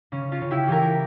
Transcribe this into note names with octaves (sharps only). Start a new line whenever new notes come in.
C#3 C#4
C#4 F4
C#3
E4 G4
E3 G4 A#4